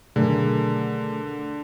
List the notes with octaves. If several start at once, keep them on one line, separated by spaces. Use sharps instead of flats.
B2 D3 D#3 F#3 A3 G#4 A#4